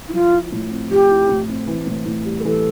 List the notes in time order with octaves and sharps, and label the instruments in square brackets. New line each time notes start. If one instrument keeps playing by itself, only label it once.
[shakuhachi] E4
[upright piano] F3 [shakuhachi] F4
[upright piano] E4
A2
C4
[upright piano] F3 [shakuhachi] G4
[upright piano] E4
A2
C4
E3
A2
A2
G3
[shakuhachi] A#4
[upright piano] E3 [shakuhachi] A4